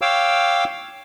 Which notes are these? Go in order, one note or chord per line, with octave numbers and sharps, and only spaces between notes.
C#5 F5 G5 D6 E6